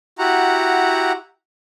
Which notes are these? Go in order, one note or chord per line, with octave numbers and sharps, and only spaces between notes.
E4 F#4 G4 F#5 A#5